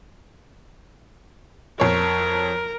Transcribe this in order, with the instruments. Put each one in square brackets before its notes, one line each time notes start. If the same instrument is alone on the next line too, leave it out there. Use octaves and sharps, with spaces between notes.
[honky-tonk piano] F2 C#5 [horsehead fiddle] A#4